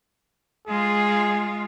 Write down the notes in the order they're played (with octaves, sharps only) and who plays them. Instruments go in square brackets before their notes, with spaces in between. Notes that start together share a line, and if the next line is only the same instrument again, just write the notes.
[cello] G#3 F4 [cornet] G#4